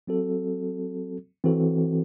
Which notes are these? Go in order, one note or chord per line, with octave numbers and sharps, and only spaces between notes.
F#3 C4 F#4 A4
E3 C4 F#4 A4